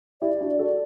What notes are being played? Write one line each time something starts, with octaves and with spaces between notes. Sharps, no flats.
E4 G4 D5
D4 F#4
F#4 A4 D5